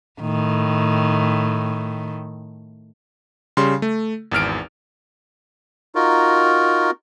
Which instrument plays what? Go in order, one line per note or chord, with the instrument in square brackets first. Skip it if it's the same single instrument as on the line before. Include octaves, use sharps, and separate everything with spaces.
[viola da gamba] A2 D#3
[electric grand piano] C#3 G3 C6
A3
G#1 E2 F6 D7
[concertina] D#4 F4 F#4 A#4